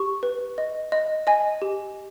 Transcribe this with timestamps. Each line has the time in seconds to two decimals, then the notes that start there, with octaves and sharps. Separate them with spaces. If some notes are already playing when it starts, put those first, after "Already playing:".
Already playing: G4 C#6
0.23 B4
0.58 D#5
0.92 D#5
1.27 D#5 G#5
1.62 G4